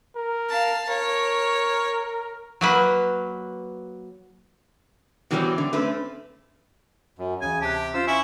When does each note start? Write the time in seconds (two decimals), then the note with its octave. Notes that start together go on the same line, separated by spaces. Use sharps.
0.16 A#4
0.49 F5 A5
0.89 A#4 C#5
2.61 F#3 A#3 B4
5.31 B2 E3 F#3 G3 A#3 C4
5.58 D3
5.73 A3 C4 C#4 B4
7.19 F#2
7.42 D2 C#3 E3 G#5
7.62 C3 G4 A5 F#6
7.94 C#4 F4 C5 E6
8.07 E4 E5 G#5 C#6